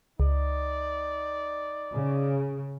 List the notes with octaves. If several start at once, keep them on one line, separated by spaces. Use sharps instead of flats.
C#2 D#4 D5
C#3